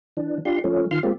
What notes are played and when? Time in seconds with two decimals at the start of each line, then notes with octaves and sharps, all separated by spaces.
0.17 E3 D4
0.45 D4 F4 G4 C6
0.64 F3 A3 C#4
0.91 D#3 F4 C6 F6
1.03 G#3 A#3 C4 F4 G4